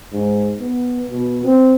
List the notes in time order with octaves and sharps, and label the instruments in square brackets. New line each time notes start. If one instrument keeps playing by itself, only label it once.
[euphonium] G#2
B3
B2
C4